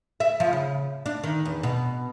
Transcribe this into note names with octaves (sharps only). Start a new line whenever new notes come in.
E5
F3
C#3
D4
D#3
E2
B2